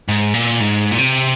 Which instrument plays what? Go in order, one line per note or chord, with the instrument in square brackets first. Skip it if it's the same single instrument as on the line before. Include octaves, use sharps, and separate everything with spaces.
[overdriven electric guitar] G#2
A#2
G#2
A#2
C3